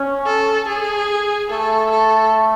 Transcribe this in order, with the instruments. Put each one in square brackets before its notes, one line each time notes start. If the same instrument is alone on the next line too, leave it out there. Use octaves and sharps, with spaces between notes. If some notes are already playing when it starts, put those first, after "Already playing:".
Already playing: [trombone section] C#4
[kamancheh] A4
G#4
[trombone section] A3 [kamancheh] A4
[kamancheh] A4